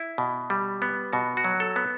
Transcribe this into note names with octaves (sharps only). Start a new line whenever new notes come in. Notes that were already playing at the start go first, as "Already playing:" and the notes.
Already playing: E4
B2
G3
B3
B2 F#4
F#4
F#3
A4
B3